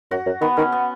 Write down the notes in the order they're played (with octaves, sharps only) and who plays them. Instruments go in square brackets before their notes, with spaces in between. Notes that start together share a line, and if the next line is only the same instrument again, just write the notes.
[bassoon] F#2 [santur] F#4
[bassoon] F#2
[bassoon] D#3 [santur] B3
[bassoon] D#3 [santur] C#4
[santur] B3